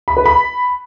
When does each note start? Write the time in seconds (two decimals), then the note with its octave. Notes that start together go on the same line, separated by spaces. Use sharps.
0.08 B5
0.17 B4
0.26 B5